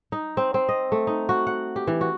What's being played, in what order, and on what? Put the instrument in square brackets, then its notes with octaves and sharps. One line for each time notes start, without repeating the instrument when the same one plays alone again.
[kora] D#4
C4
C4
D#5
A3
D#4
F#4
F#5
G4
E3
F#4